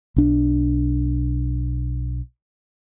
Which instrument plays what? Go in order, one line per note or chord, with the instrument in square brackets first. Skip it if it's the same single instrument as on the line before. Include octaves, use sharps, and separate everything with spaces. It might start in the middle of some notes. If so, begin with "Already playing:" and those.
[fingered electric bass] B1 D4